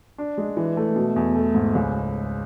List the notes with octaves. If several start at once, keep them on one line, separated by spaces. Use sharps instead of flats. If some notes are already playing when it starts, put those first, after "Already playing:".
D4
G#3
E3
A3
B2
E2
A3
G#2
C#2